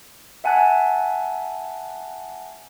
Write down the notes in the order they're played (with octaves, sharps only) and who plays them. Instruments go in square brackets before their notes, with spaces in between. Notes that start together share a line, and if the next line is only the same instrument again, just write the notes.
[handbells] E5 F#5 G#5 A5 F#6